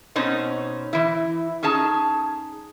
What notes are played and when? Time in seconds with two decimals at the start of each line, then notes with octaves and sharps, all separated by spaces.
0.16 B2 C4 C#4 D#4
0.93 E3 E4
1.63 C#4 D#4 G#4 A5